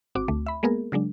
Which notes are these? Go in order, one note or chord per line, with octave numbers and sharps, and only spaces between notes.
G#1 C4 F#4 D6
D2 A3
E5 B5
G#3 A#3 B3 G#4 A#4
C#3 F#3 G#3 D4